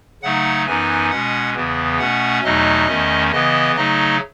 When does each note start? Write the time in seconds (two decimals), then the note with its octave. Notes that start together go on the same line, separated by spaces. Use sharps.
0.23 C#3 F#3 A3 D#4 F#5
0.67 F#2 E3 B3 D#4 G#5
1.11 B2 G#3 C#4 F#5
1.55 E2 C#3 E3 B3
1.99 B2 A3 C#4 F#5
2.43 E2 B2 F#3 A3 D#4 D#5
2.87 E2 D#3 A3 C#4
3.32 C#3 E3 B3 D#5
3.75 C#3 F#3 A3 D#4 D#5